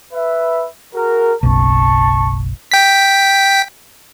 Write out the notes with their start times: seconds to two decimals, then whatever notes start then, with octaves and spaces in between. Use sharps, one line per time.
0.14 B4 E5
0.94 F#4 G#4 A#4
1.43 F#1 B1 A5 C#6
2.71 G5 B6